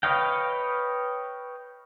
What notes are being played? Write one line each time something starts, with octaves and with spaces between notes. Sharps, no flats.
B4 C#5 D#5 F5 G5